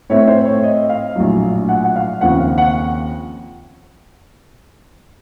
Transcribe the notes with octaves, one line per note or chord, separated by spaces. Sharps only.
A2 A3 C4 C#5
C5
C#5
D#5
F5
A#1 A2 F#3
F#5
F#5
F5
D#2 C#3 F3 C4 F#5
F5
F#5